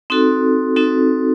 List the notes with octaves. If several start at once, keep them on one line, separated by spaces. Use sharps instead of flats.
C4 D#4 F#4 A4
C4 D#4 F#4 A4